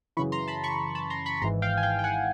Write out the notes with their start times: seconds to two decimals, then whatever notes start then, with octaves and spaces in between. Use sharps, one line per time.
0.17 F#2 C#3 E3 B5 C#6
0.32 A#5 C6
0.48 A5 B5
0.63 B5 C#6
0.95 A5 B5
1.10 A#5 C6
1.26 B5 C#6
1.37 C#6
1.42 G#1 G#2 E3 A#5 C6
1.62 F5 G5
1.77 G#5
1.83 F5 G5
1.99 G5
2.04 F#5 G#5